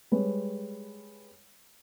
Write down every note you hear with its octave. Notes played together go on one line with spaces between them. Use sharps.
G3 G#3 B4 C#5